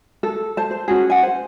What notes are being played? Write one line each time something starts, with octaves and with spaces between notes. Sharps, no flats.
A4
C5 A5
C5
C#4 F#4 G#4
F#5 G#5
C5